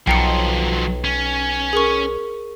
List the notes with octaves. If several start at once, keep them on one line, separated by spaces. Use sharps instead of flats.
B1 F3 F#3 G5 A#5 C#7
C#4
G#4 A#4 C#6